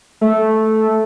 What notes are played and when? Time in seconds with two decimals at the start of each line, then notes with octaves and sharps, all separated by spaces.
0.21 A3